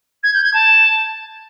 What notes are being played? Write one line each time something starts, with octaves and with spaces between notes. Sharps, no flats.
G#6
G6
G#6
A5